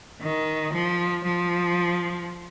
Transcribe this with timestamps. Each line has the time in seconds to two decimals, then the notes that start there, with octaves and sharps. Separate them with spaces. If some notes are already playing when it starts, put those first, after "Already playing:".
0.22 D#3
0.73 F3
1.25 F3